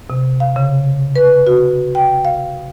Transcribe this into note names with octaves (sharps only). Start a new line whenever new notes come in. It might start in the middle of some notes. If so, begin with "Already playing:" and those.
C3
F5
C#3
B4
F#4
G5
F5